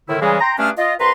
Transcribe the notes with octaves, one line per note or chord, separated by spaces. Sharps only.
A2 D3 D#3 E4
C#3 E3 G3 G#3 G#4
G5 A#5 C6
G2 A3 C#4 D4 G#4 F6
F4 D#5
C2 B4 A#5 C6